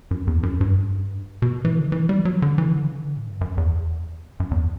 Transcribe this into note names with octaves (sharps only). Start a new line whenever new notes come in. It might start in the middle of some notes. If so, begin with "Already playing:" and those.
F#2
E2
F#2
G2
B2
E3
D3
E3
G3
F#3
D3
E3
D3
C#3
D3
A2
G2
F#2
E2
F#2
E2